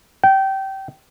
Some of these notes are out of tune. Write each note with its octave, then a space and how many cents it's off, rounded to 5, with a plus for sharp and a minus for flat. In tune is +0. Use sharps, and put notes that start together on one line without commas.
G5 -20